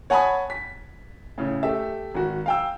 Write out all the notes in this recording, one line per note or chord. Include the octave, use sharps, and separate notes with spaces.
C#5 F#5 G#5 A5 B5 D#6
B6
A2 C#3
A3 G4 E5
G#1 F#4
F5 G5 E6